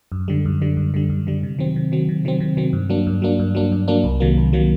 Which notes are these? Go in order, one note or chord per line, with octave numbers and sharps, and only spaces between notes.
F#2
D3 G3
F#2
D3 G3
F#2
D3 G3
F#2
D3 G3
C3
D#3 F#3 C4
C3
D#3 F#3 C4
C3
D#3 F#3 C4
C3
D#3 F#3 C4
G2
F#3 A#3 D4
G2
F#3 A#3 D4
G2
F#3 A#3 D4
G2
F#3 A#3 D4
C2
C3 D#3 F#3 A#3
C2
C3 D#3 F#3 A#3